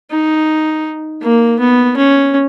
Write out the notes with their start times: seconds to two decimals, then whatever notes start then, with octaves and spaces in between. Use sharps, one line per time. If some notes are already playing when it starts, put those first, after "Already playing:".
0.11 D#4
1.22 A#3
1.59 B3
1.96 C#4